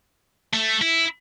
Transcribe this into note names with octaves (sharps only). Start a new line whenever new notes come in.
A3
E4